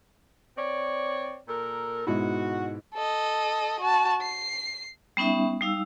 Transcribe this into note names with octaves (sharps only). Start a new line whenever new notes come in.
C4 C#5 D5
A#2 A4 A#4
G#2 B2 E4 F#4
A4 D#5
F#4 A5
C7
G3 B3 C#4 D#4 E5
G3 D#4 F5 E6